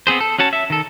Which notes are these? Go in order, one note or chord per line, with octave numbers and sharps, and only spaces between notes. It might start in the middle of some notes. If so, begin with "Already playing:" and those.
B3 C4 G#4 C5
A4
C#4 F#4 C#5 A5
E5
D#3 A4